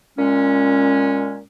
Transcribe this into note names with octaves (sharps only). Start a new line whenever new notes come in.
A#2 G#3 C#4